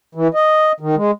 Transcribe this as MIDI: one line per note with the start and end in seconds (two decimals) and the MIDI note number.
0.15 0.28 52
0.35 0.72 75
0.80 0.95 51
0.96 1.11 56